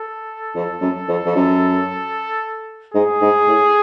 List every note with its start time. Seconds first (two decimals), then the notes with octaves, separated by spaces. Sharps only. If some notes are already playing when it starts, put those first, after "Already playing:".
Already playing: A4
0.55 F2
0.81 F#2
1.08 F2
1.26 F2
1.35 F#2
2.94 G#2 G#4
3.22 G#2
3.48 A2